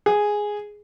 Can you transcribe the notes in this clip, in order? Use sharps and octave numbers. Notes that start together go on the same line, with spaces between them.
G#4